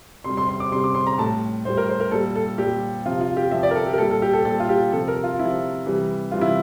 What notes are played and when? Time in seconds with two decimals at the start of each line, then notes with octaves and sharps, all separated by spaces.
0.24 C3 G3 C6
0.37 C6
0.49 C6
0.60 D6
0.71 C3 G3 C6
0.84 D6
0.95 C6
1.07 A#5
1.18 A2 G3 A5
1.65 A2 G3 C5
1.77 A#4
1.89 C5
2.00 A#4
2.11 A#2 G3 A4
2.36 A4
2.58 A#2 G3 G4
3.06 C3 F3 F4
3.21 F4
3.37 G4
3.51 C3 F3 E5
3.63 D5
3.71 A#4
3.75 A4
3.86 G4
3.93 A#4
3.98 A#2 G3 A4
4.11 A4
4.22 G4
4.33 A4
4.45 A#2 G3 A4
4.60 F4
4.69 G4
4.92 C3 F3 A4
5.08 A#4
5.24 F4
5.38 C3 F3 E4
5.85 C3 E3 G3
6.32 C3 E3 G3 F4
6.41 E4